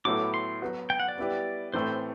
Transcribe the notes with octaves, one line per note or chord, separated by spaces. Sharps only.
A2 F#3 B3 E4 A4 D6
C6
F#3 B3 F#4 B4
G5
F#5
D5
G3 B3 E4 G4 B4
A2 E3 A3 C4 C5